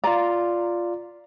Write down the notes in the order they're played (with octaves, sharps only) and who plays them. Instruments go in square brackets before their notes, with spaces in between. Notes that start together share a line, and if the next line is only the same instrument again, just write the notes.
[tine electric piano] F4 D5 [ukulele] A#5